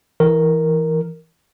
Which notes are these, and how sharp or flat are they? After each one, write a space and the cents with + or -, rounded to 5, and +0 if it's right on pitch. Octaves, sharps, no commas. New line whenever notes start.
E3 +0 A#4 +0